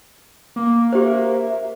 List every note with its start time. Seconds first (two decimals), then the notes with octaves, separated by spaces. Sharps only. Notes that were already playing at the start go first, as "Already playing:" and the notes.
0.56 A#3 D6
0.93 G4 C5 E5